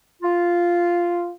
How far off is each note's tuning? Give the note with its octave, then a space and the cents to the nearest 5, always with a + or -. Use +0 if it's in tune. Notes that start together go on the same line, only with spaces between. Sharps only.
F4 -5